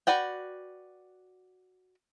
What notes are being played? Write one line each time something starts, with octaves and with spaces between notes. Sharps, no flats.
F#4 B4 D5 F#5 G5